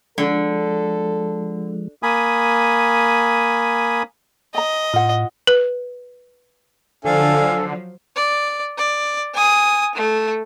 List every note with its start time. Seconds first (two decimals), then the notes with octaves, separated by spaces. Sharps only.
0.18 D3 F3 G#3 A4
2.03 A#3 G#5 B5 D#6
4.54 D#5 G#5 A#5
4.93 A2 F4 F#5
5.47 B4
7.05 D3 F3 F#3 D4 A4 F5 G#5
8.16 D5
8.78 D5
9.34 G#5 D#6
9.95 A3